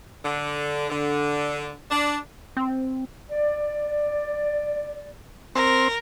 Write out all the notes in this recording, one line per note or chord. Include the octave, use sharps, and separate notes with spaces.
D3
D3
D4
C4
D5
C4 A#4